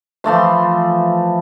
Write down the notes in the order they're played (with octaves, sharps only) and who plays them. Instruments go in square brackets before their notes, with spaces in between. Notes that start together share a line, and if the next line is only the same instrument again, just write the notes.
[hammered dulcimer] E3 F3 A3 C6